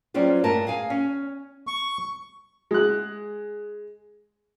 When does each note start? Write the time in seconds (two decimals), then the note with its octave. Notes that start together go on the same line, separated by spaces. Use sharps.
0.14 F#3 G3 C4 C#4 F4 G#4
0.44 G2 A3 A#4 A5
0.67 G#4 F5 G#5
0.90 C#4
1.67 C#6
2.71 G#3 F#6